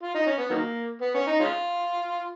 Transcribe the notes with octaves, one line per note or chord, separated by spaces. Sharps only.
F4
D#4
C#4
B3
D#3 F#3 A#3
B3
C#4
D#4
G#3 C#4 F4